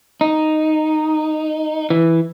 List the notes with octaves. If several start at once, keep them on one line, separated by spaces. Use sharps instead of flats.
D#4
E3